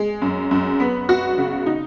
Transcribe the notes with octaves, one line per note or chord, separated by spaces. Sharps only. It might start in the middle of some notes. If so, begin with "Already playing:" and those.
Already playing: G#3
F#2
F#2
B3
F#4
C#3
D#4